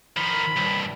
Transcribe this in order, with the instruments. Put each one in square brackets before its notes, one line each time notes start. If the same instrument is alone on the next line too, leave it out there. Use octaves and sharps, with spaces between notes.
[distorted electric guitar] D#3 F3 [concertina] B5
[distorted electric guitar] C2 G2